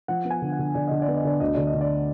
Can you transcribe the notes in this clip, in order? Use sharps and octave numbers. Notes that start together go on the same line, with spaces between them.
F3 F#5
B3
G#5
D3
F#5
D3
D3 D5
D3 D#5
D5
B3
D#5
D3 D5
D2 D#5
D3 D5
D#5
D3
D5